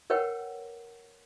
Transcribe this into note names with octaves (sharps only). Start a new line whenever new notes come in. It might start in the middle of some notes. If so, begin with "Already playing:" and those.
A#4 B4 C#5 F#5 G5